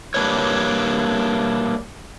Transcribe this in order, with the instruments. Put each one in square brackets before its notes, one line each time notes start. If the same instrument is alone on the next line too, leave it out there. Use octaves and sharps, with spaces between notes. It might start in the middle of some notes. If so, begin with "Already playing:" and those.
[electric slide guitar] G3 A#3 C#4 D4 B4 C#5